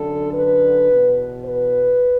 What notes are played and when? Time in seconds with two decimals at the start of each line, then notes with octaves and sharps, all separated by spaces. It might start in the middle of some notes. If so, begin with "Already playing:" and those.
Already playing: F#2 D3 A4
0.34 B4
0.90 E2 B2
1.45 B4